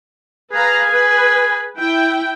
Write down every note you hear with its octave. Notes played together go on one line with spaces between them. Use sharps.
G#4 B4 F5 A#5
B4 G#5
E4 G5